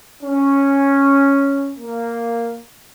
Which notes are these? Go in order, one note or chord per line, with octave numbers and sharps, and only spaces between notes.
C#4
A#3